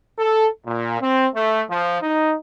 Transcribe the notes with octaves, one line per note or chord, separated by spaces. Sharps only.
A4
A#2
C4
A3
F3
D#4